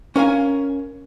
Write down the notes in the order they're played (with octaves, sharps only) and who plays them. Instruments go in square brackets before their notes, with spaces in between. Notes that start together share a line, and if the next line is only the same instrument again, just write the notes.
[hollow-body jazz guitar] C#4 A#4 F5 G#5